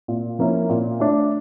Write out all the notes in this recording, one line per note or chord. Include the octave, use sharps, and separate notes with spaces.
A#2
F3 A#3 C#4 E4
A#2
A3 D4